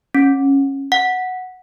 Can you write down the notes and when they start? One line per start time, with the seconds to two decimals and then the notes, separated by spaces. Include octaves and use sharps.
0.15 C#4
0.92 F#5